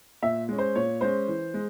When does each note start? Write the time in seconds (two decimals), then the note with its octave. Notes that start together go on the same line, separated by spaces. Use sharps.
0.22 A#2 E5
0.49 G#3 C#4
0.58 C5
0.75 A#2 C#5
1.01 G#3 C#4 C5
1.28 E3
1.54 G#3